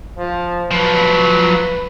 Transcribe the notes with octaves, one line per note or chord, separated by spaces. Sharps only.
F3
F3 F#3 B4